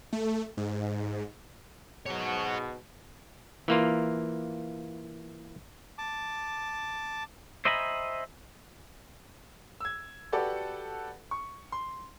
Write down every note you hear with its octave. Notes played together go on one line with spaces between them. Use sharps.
A3
G#2
G#2 B2 F#4 C#5
E3 A#3 F4
A5 D6
C5 D#5 E5 G#5 A#5 B5
E6 G#6
F#4 G4 A4 B4 D5 F#5
C#6
C6